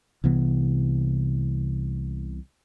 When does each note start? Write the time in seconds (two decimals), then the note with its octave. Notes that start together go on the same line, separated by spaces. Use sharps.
0.24 C2 C3 E3 B3